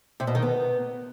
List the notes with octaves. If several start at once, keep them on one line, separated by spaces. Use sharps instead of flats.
C3
B2
D#3
B3